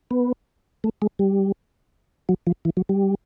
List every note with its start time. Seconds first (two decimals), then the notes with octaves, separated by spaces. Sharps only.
0.11 B3
0.84 A3
1.02 G#3
1.19 G3
2.29 F#3
2.47 F3
2.65 E3
2.77 F#3
2.89 G3